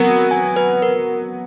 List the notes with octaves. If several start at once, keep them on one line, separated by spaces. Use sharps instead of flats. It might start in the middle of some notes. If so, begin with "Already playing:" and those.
Already playing: F#3 B3 F#4 A#4
G#5
B4
A#4